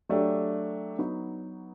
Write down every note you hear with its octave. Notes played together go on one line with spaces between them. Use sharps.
F#3 A3 D4 G4
F#3 B3 D#4 F#4